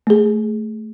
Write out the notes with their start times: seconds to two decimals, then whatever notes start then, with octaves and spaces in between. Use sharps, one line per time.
0.07 A3 G#4